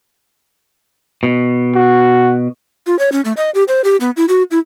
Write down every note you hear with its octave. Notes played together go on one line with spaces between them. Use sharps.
B2
F#4
F4
C#5
C#4
A3
D#5
G4
C5
G4
B3
E4
F#4
E4